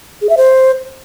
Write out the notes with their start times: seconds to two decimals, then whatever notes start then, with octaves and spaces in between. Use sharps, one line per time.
0.21 G#4
0.29 E5
0.37 C5